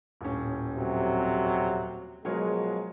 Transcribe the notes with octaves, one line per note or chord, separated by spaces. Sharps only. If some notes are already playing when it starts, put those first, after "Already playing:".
D#1 A2 C#4
F2 C3 F#3
B2 F3 F#3 G#3 A#4 C#5